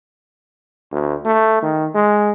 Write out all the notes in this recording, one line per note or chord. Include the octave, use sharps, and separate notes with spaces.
D2
A3
D#3
G#3